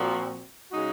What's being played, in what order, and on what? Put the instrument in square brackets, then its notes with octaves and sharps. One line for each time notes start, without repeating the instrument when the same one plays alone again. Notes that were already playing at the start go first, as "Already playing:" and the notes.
Already playing: [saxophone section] A#2 F3 C4 F#4
C#3 G#3 D#4 F#4